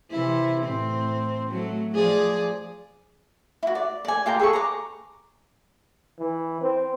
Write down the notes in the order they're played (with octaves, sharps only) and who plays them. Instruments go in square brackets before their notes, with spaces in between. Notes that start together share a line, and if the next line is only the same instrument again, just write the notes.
[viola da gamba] C3 E3 E4
A2 C4
F#3 A3
F3 G#4 D5
[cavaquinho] E4 F#4
D5
D5 G#5
F4 G4 G5 A#5
G#4 A4 B4 C#6
A#5 D6
[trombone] E3
C4